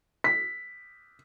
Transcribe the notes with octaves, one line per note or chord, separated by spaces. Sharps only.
B6